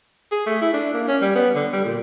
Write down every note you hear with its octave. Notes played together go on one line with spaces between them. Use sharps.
G#4
A3
E4
D4
A#3
C#4
G3
B3
D3
G3
A#2